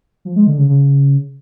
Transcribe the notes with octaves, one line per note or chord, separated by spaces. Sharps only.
F3
G#3
D3
C#3
C#3